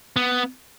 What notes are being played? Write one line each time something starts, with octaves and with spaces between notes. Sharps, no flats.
B3